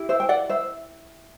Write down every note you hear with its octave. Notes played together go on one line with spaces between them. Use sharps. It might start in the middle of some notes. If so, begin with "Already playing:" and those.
Already playing: E4 G4
C5 E5
G5
D5 F#5
C5 E5